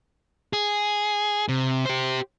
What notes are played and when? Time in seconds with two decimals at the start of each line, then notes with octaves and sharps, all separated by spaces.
0.53 G#4
1.49 C3
1.85 G4 C5